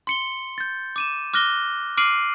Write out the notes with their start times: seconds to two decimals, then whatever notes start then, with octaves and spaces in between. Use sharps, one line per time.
0.07 C6 C#7 G7
0.58 G6 A6
0.96 D6 D#7 E7
1.33 D6 F6 F#6 A#6 G7
1.98 D6 F6 C7 D7 D#7 F#7